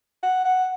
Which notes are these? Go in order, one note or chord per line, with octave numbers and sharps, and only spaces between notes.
F#5
F#5